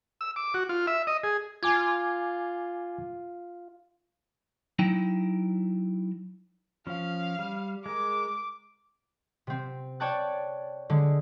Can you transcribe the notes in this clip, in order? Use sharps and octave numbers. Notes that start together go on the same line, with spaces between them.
E6
D6
F#4
F4
E5
D#5
G#4
F4 G#5 D6 G#6
F#3 D#4 E4 G5
F3 C#4 F5
G3
G#3 A#4 D6
C3 C4
C#5 D5 G5 A5 F#6
D3 G#3